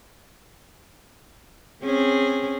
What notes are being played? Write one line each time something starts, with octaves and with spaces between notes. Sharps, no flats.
C4 C#4 G#4